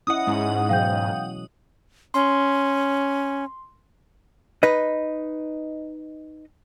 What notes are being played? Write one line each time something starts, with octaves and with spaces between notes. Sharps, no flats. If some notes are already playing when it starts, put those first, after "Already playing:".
C#4 E4 D#5 F#5 D#6
G#2 G#3 C#4 E4
B2 E3 F#3 F5 G5 G6
C#4 C6
D#4 B4 D#5